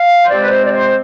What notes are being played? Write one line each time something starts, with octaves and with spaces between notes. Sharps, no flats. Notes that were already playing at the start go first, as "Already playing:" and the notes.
Already playing: F5
C5
C3 F3 G#3 C4 D5
B4
C5
D5
C5